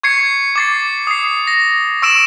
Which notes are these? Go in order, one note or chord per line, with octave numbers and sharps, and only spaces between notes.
C#6 G#6 C7 C#7
D6 A6 C7
D#6 C7
A#6
C#6 E6 D7 E7